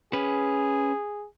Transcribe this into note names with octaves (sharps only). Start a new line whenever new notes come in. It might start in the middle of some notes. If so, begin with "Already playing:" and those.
C#4 G#4 B4